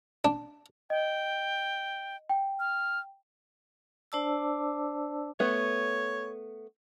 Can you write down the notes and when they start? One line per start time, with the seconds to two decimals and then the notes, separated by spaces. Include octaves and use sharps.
0.25 D4
0.90 D#5 G5
2.29 G5
2.59 F6
4.12 D4 C5 D5 A5 D6 E6
5.40 A3 B3 C#5